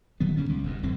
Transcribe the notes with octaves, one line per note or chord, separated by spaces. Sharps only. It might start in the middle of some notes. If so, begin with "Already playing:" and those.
D#1 D#3 F#3 B3
C#3 G3 C#4
C#2
E1 E2 G2
D1 F#2 C4